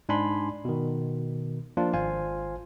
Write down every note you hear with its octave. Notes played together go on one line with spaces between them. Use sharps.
G#2 D4 D#4 G#5 B5 C6
B2 D#3
F3 A#3 D4 F4
G#1 F4 C5 F5 G#5